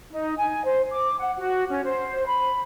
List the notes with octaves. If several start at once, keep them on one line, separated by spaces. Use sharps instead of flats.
D#4
G#5
C5
D6
F#5
F#4
C#4
C5
B5